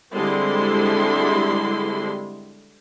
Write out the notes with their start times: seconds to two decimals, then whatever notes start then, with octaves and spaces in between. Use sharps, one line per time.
0.14 D3 G3 G#3 C4 E4 C6